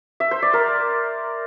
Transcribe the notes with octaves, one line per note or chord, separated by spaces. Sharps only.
E5
C5
D5
A#4